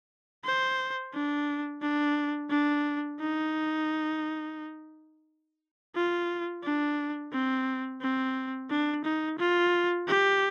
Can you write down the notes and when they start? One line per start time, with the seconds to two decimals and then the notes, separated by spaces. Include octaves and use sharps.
0.44 C5
1.13 D4
1.81 D4
2.50 D4
3.19 D#4
5.95 F4
6.63 D4
7.33 C4
8.01 C4
8.70 D4
9.04 D#4
9.38 F4
10.08 G4